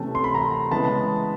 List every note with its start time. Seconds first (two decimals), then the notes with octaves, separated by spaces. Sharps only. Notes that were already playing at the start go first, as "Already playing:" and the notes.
Already playing: C3 E3 A3 C#4
0.15 C6
0.24 B5
0.34 A#5 C6
0.71 C#3 E3 G#3 B3 A5 B5